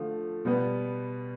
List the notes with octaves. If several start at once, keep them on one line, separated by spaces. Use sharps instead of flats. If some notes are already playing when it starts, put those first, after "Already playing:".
Already playing: D3 F3 A3
B2 G3 B3